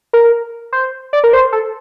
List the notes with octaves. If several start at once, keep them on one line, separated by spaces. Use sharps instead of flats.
A#4
C5
D5
A#4
C5
A4